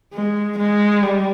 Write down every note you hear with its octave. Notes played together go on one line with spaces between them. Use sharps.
G#3
G#3
G3